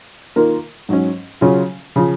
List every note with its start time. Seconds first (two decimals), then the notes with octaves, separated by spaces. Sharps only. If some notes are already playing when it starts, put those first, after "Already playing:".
0.36 D#3 A#3 F4 A#4
0.89 G#2 F#3 C#4
1.41 C#3 F#3 C#4 F4
1.96 C#3 F3